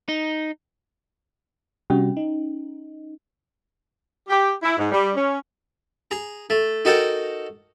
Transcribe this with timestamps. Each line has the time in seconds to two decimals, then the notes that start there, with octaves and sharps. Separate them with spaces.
0.09 D#4
1.90 C3 G3 C#4 F#4
2.17 D#4
4.29 G4
4.62 E4
4.77 G#2
4.91 G3
5.15 C#4
6.11 G#4 A#5
6.50 A3
6.85 D#4 F#4 A4 A#4 F#5 G5